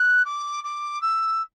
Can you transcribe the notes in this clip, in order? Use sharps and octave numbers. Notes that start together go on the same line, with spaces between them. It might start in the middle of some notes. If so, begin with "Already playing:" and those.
Already playing: F#6
D6
D6
E6